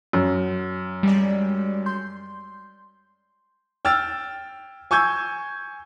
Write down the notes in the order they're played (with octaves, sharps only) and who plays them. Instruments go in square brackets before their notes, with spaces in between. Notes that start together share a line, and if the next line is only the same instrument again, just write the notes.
[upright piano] F#2
[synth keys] G3 G#3 D5
C6 G6
[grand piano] G5 E6 F6 A6
G#5 C#6 E6 G6 G#6